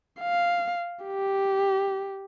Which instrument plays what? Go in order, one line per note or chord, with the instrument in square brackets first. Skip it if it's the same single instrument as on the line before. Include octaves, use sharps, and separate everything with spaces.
[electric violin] F5
G4